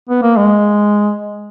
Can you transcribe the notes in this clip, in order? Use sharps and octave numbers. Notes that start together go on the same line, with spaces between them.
B3
A#3
G#3